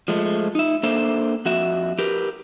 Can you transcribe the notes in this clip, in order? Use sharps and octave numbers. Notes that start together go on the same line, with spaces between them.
F3 G#3 A3
D#4 E5
A#3 D4 A4 C5 E5
F2 F#4 E5
G4 A#4 B4